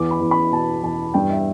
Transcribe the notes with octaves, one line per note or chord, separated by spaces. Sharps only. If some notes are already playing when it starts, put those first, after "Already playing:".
Already playing: E2 D6
B5
E2
B5
B2 A5
E2 A5
G2 G5
E5